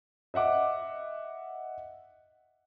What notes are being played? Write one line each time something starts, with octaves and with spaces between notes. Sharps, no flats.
D#5 E5 F#5 D6